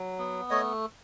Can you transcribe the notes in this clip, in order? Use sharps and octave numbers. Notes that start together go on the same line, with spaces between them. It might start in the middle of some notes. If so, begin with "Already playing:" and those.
Already playing: F#3
B3
A3 C#5 D#5